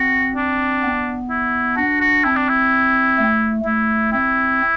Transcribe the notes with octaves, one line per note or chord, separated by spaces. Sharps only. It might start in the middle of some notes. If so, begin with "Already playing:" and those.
Already playing: C4 F#4
D4
B3
E4
D4 F#4
F#4
C4 E4
D4
E4
A3
A3 E4
C4 E4